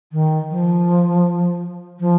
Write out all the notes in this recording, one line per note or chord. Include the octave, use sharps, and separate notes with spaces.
D#3
F3
F3